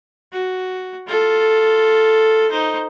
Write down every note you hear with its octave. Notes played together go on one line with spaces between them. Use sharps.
F#4
F4 A4
D#4 C5